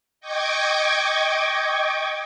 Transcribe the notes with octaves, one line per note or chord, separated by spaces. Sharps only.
D#5 G5 C#6 D6 G#6